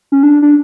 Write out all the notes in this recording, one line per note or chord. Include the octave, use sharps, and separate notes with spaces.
C#4
D4
D4